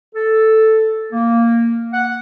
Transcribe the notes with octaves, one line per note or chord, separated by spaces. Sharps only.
A4
A#3
F#5